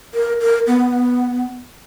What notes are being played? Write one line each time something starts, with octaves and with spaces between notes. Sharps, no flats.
A#4
A#4
B3